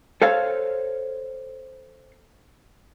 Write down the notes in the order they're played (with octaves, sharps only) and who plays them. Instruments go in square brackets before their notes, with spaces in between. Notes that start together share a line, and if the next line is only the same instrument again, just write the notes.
[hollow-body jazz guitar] A4 C5 C#5 F5